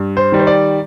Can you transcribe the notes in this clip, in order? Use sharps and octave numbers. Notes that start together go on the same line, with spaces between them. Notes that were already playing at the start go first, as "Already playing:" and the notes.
Already playing: G2
C5
D#3 G3
C5
D5